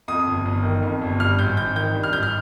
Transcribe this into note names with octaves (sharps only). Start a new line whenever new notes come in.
F2 D#6
G1
G1
D#3
F2
G1
G2 F6
G#1 G6
G#1 G6
D#3 G6
G2
F6
G#1 G6
F6